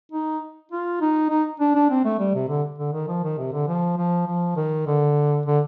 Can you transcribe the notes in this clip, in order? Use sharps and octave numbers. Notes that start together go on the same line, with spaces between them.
D#4
F4
D#4
D#4
D4
D4
C4
A3
G3
C3
D3
D3
D#3
F3
D#3
C3
D3
F3
F3
F3
D#3
D3
D3